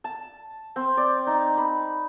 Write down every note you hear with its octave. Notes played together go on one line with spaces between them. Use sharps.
A5
C4
D5
D#4
B5